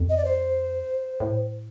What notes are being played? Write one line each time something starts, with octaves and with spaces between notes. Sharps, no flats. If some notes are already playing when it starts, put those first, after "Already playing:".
Already playing: F2
D#5
D5
C5
A2